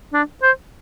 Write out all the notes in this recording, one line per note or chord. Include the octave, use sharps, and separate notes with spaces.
D4
C5